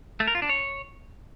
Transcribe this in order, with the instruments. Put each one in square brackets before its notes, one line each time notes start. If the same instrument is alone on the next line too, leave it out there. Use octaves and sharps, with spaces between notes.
[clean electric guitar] A3
A#4
F4
D4
C#5